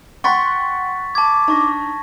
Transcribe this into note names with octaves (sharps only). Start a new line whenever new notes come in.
F#5 G5 C6 C#6 A6 B6
A5 D6 G#6
D4 D#4 A5 C#6 A#6